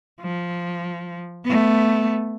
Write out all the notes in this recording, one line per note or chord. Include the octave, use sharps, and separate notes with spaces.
F3
A3 B3